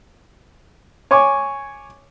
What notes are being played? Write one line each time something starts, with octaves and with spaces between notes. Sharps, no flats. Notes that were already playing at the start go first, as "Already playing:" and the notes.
C#5 G#5 C#6 D6